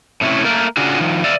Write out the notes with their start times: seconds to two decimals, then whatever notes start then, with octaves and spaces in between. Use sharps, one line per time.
0.21 A2 C3 A3 C#4 E4
0.44 A3 A#3 A#4
0.77 C#3 D4 F4 F#4 G#4
0.99 D#3 F3
1.24 D5 E5 F5